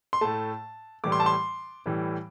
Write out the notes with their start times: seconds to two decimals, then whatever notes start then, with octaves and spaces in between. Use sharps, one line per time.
0.13 C6
0.21 A2 A3 A5
1.04 A2 E3 G3 D6
1.12 C6
1.20 A5
1.26 C6
1.86 A2 E3 G3